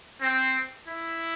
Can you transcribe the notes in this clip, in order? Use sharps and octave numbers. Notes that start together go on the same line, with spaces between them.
C4
E4